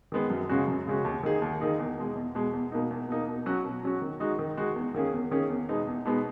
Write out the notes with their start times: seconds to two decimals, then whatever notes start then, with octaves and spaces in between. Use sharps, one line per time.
0.12 D#3 G#3 B3
0.30 F#2
0.49 C#3 G#3 C#4 F#4
0.67 F#2
0.86 C#3 G#3 C#4 F#4
1.05 D#2
1.23 D#3 A#3 D#4 G#4
1.42 D#2
1.60 D#3 A#3 D#4 G#4
1.79 E2
1.98 B2 G#3
2.16 E2
2.35 B2 G#3
2.53 E2
2.72 B2 A#3 D#4
2.91 E2
3.09 B2 A#3 D#4
3.27 B2
3.46 F#3 C#4 F#4
3.65 B2
3.83 F#3 C#4 F#4
4.02 D#3
4.20 G#3 D#4 F#4
4.39 D#3
4.57 G#3 D#4 F#4
4.76 E2
4.94 D#3 A#3 C#4 G#4
5.13 E2
5.31 D#3 A#3 C#4 G#4
5.50 E2
5.69 B2 G#3 B3 D#4
5.87 E2
6.05 B2 G#3 B3 D#4